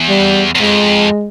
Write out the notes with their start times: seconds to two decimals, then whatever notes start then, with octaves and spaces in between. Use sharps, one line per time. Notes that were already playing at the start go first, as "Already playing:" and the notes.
Already playing: E2
0.09 G3
0.55 E2
0.60 F2 G#3